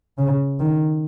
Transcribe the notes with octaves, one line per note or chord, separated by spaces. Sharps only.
C#3
D#3